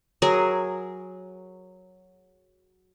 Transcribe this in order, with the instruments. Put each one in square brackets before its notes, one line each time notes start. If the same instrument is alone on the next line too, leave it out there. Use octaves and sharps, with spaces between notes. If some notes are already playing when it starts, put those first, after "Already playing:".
[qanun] F#3 G#4 A#4 G#5